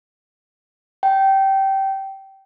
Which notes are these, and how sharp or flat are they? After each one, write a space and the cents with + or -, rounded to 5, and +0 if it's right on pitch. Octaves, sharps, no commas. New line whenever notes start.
G5 -20